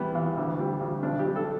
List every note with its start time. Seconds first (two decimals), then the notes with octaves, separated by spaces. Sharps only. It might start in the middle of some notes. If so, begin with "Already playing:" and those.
Already playing: E2 G3 B3
0.15 E2
0.37 D2
0.59 G3
0.81 D2
1.03 B1 D4
1.19 G4
1.25 G3
1.36 A4